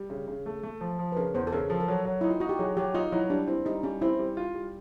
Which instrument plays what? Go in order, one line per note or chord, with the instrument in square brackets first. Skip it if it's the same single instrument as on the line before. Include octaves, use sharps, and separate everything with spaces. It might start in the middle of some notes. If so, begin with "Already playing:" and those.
Already playing: [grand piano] G3
C#3
C#3
A3
A3
F3
F3
[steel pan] B4
[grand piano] C#3 [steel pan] A#4
[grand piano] E2 [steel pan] C5
[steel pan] A4
[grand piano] C#3 [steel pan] A#4
[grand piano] F3 [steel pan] A4
[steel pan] A#4
[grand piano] F#3 [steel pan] A4
[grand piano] F#3
[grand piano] D#4 [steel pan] E4
[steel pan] F4
[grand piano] D#4 [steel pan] F#4
[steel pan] G4
[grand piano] F#3 [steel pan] G#4
[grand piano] F#3 [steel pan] G4
[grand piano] D#4 [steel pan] F4
[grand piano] F#3 [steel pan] E4
[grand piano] G3 [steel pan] D4
[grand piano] C4 [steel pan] E4
[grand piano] G3 [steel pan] D#4
[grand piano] G3 [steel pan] C#4
[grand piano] C4 [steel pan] E4
[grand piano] G3
F4
G3